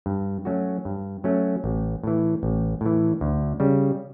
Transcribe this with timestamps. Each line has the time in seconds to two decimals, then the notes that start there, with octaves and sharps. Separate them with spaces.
0.06 G2
0.45 F#3 A3 C#4 F#4
0.85 G2
1.24 F#3 A3 C#4 F#4
1.64 A1
2.03 A2 E3
2.43 A1
2.81 A2 E3
3.21 D2
3.60 C#3 G3